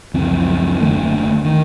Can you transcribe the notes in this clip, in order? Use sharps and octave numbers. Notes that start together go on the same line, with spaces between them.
C#2 F#2 F3 C4
F#1 D#2 D3 A3
D#3